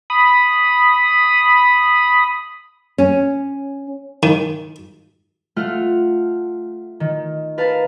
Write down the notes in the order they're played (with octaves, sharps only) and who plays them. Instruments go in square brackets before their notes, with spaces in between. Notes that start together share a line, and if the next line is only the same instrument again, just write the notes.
[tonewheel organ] B5 D#6
[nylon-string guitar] C#4
[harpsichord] D#3
[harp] A3 F4 F#5 F6
D#3
A#4 B4 F5 A5